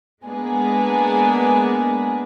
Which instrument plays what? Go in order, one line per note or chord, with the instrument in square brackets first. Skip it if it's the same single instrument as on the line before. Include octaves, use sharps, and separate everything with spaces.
[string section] G#3 A#3 B3 D4 G#4 B4